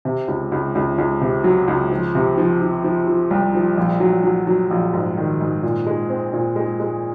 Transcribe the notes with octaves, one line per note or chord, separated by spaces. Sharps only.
C3
C#2
C#2
C#2
C#2
C3
F#3
C#2
F3
C3
F3
F3
F3
F3
C2
F3
A#1
F#3
F#3
F#3
A#1
G#2
D#3
G#2
A#2
G#3
C4
A#2
G#3
G#3